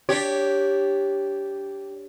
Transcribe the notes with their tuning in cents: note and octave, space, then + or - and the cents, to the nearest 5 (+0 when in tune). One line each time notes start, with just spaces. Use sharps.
D4 -15 G4 +0 C#5 +0